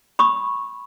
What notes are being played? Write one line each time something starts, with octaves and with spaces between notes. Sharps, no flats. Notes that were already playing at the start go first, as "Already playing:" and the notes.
B5 C#6 D#6